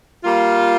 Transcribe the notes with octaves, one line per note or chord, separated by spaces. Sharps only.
G3 A#3 F4